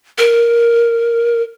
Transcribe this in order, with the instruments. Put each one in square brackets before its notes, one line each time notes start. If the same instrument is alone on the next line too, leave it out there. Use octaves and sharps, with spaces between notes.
[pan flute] A#4